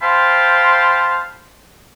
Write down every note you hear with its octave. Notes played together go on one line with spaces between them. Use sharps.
C5 F5 G5 A5 B5 C6